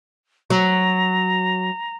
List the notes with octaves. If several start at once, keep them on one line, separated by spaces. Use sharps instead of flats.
F#3 A#5